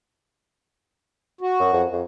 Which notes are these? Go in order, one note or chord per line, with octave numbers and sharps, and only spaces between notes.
F#4
F#2
F2
F2